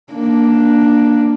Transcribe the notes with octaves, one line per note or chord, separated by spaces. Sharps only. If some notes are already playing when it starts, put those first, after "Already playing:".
A#3 D4